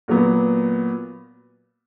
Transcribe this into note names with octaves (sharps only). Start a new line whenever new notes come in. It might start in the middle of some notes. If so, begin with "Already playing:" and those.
A#2 F#3 B3